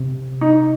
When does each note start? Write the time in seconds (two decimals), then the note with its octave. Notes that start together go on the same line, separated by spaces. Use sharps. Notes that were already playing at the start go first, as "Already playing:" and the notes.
Already playing: C3
0.41 D#4